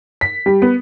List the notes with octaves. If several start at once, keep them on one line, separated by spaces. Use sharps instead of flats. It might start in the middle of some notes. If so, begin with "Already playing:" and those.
B6
G3
B3